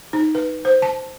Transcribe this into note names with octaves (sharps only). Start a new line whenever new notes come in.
D#4
B4
C5
A5